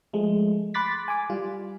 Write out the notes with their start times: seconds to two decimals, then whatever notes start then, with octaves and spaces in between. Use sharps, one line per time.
0.13 F3 G#3 A3
0.74 B5 C6 D6 F#6 A6 B6
1.08 G#5 D6
1.30 G3 F4